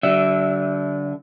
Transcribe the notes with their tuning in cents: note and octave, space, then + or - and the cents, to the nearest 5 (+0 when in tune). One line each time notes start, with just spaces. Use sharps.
D3 -25 F#3 +45 E5 +0